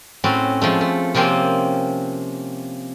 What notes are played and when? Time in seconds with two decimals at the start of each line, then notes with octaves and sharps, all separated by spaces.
0.24 A2 C4 C#4 F#4 A5
0.62 F3 G#3 A3
0.81 A3
1.15 C3 F3 A#3 C4 C#4